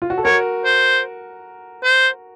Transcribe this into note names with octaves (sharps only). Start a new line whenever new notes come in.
F4
F#4
A4
F#4 A#4 C#5
C5
C5